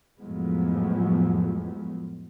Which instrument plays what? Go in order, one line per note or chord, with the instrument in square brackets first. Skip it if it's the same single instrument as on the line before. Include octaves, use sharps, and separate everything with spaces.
[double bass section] F2 A2 F3 F#3 G#3 B3